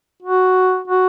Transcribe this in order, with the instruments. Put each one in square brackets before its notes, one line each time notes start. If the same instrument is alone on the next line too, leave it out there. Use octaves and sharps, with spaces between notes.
[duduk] F#4
F#4